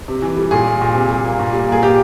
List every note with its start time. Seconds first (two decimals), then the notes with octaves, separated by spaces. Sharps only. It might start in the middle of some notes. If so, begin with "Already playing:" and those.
0.08 C3
0.22 E3
0.37 G3
0.51 A#2 G#4
0.66 G#3
0.81 A#2
0.95 C3
1.09 G3
1.25 A#3
1.39 A#2
1.53 G3
1.68 A#3 G#4
1.83 A#2 G4